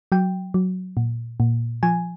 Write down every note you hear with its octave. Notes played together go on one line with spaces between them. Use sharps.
F#3 G5
F#3
A#2
A#2
F3 G#5